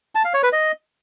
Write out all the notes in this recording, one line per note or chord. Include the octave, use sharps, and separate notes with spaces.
A5
F5
C#5
B4
D#5